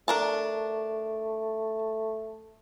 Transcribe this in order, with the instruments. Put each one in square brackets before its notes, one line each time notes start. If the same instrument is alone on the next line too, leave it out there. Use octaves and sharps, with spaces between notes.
[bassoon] A3 [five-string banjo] D4 A#4 A5